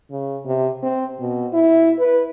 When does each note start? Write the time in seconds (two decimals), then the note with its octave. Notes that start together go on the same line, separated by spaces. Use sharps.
0.11 C#3
0.46 C3
0.83 C4
1.20 B2
1.53 E4
1.99 B4